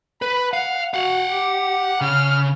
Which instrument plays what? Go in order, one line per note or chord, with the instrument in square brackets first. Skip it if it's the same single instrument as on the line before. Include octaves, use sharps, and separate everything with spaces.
[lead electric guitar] B4 [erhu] B5
[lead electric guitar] F5 [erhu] F#5
[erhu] F#4 [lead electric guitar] F5 F#5
[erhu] G4
[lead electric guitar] C#3 [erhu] F6